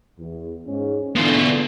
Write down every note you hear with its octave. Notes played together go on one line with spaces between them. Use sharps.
E2
G#2 C#4
B2 D3 E3 F4